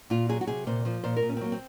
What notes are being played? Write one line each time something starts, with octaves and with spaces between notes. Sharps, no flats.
A#2 F4
F#3 G#4
F#4
C3 G#4
A#2 C5
F3 C5
A#2 C5
A#4
A#2
C#4
C4
F#3 A#3
C4